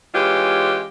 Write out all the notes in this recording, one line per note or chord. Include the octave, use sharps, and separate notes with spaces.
E3 G#3 C#4 F4 G4